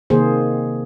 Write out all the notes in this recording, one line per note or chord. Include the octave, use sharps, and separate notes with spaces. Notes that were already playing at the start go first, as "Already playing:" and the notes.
C3 D#3 A#3 C4 G#4 C5